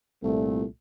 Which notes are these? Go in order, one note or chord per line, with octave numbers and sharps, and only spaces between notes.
C2 A#2 A3